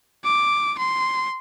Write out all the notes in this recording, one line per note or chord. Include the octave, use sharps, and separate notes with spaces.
D6
C6